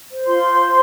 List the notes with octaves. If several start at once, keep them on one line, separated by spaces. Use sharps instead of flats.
C5
F4 C6
C5
C5